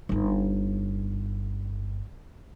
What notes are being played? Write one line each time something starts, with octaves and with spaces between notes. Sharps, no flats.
G1 D#4